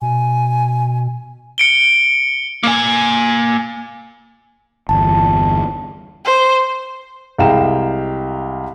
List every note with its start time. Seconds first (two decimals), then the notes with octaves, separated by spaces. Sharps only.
0.02 B2 G#5
1.58 C#7 D7 G7
2.63 A#3 G#5
4.89 G1 E2 A5
6.25 C5
7.38 C2 G#3 F5 G5 A#5 E7